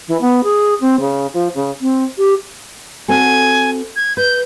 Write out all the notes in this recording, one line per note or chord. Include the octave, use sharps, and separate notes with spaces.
E3
B3
G#4
C4
C#3
F3
C#3
C4
G4
C4 F#4 A4 G#5
G#6
B4 G6